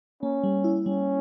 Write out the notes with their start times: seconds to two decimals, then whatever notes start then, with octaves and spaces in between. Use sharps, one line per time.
0.22 A#3 C#4
0.44 G3
0.64 E4
0.86 G3 C#4